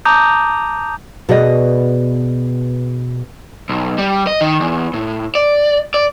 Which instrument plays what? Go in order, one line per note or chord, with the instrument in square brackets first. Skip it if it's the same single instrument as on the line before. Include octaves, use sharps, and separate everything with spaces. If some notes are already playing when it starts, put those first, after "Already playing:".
[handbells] A5 A#5 D6 D#6 G6
[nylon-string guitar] B2 F#4 G#4 B4 D5 D#5
[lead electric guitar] B1
G3
D#5
D#3
E2
A2
D5
D5